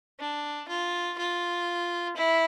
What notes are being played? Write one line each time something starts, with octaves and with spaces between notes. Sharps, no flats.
D4
F4
F4
E4